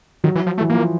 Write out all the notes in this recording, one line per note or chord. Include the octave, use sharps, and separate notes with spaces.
D#3 F#3
E3
F3
A3
E3
F3 A#3